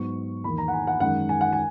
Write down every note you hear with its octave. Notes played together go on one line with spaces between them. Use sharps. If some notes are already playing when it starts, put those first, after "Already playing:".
Already playing: G#2 F#3 B3 C#6
E2 D#3 A#3 B5
A#5
F#5
G#5
F#5
F#2 D#3 G#3 F#5
G#5
F#5
G#5